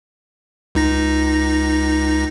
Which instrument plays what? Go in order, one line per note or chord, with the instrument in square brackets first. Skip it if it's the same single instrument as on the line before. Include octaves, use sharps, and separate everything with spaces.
[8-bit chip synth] C#2 D#4 A#6